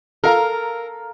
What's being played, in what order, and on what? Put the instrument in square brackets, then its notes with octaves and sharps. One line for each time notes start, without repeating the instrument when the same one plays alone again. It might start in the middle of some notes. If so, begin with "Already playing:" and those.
[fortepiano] A4 F5 [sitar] A#4